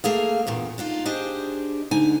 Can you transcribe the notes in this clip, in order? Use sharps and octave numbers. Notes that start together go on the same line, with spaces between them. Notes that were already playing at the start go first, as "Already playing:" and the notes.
A3 A#3 G#4 F5
E2 G2 A#2
D4 D#4 F4
D4 G4 G#4 C5 D#5
D2 D3 D#4 G#5